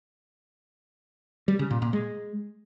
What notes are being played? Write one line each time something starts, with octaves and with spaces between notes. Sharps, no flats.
G3
C#3
A#2
A#2
G#3